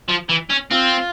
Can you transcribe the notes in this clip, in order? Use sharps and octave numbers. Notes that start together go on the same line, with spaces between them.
F3
E3
C#4
C4 F4